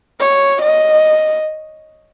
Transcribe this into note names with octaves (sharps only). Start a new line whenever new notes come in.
C#5
D#5